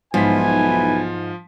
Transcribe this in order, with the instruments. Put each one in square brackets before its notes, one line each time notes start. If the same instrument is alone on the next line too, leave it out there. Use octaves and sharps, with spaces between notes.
[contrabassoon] B1 [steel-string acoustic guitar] G#2 [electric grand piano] F3 F4 B6 [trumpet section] E4 B4 G#5